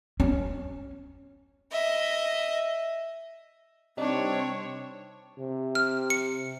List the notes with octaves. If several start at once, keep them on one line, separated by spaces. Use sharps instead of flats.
C#4
D#5 E5
C3 G3 C4 D4 D#4 C#5
C3
F6
C#7